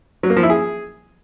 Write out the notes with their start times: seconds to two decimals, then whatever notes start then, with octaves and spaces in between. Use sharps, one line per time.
0.23 F#3
0.30 A#3
0.37 F3
0.43 E4
0.50 G#4